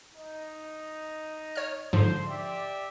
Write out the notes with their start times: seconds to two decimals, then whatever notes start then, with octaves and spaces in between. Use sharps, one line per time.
0.14 D#4
1.56 C#5 F6
1.93 G#2 D3 F3 C5
2.28 G4 D5 E5